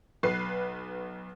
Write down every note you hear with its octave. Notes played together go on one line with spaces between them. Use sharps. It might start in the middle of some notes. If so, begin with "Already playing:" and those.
B1 B4 C7